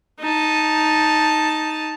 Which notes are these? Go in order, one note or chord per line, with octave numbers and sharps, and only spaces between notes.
D#4 A5